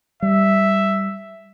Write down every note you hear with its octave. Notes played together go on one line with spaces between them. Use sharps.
G3 E5